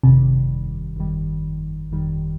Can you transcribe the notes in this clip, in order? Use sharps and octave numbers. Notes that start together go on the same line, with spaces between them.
G1 F2 C3 D#3 G3
G1 F2 D#3 G3
G1 F2 D#3 G3